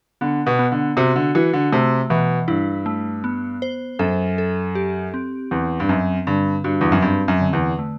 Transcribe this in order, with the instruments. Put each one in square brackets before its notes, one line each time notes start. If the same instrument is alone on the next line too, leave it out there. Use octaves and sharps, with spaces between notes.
[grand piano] D3 [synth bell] B3
[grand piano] B2
[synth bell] B3
[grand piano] D3
[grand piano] C3 [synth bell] F#4
[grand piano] D3
[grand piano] E3 [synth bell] F#4
[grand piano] D3
[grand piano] C3 [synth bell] A3
[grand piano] B2 [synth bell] E3
[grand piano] G2 [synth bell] E4
[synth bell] A3
B3
C5
[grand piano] F#2 [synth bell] A4
[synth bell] A4
G4
C4
[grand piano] E2 [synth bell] C4
[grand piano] G2
[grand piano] F#2 [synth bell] C4
[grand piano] G2 [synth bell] D3
[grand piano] G2 [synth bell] F#4
[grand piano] E2
F#2
[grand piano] G2 [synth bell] C4
[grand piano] F#2
[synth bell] D3
[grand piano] E2
[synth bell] A3